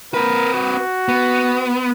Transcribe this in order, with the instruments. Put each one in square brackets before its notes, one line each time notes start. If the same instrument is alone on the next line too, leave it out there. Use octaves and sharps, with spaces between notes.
[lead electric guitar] C4 B4 [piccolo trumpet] A#4
[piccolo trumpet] F#4
[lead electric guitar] B3